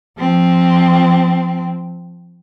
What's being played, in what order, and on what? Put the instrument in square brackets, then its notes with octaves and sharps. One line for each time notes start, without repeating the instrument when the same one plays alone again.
[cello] F3 C4